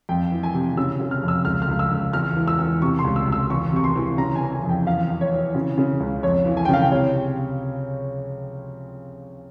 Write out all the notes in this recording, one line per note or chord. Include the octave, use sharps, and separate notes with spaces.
F2 G5
E3
G#5
C3
C#3 E6
C#3
F6
F2
E6
C#2 F6
F6
C#2
E6
C#2
E2 F6
E3
E6
E2
C3 C#6
C6
C#2
E6
C#2 E6
E2 C#6
C3 C#6
C6
E3
C#3 A#5
G#5
E3
G#5
F2
G5
E2 F5
E3
C#5
E3
C#3
C#3
C#2
F2 C#5
E3
G#5
G5
C#3 F5
G5
C3 C#5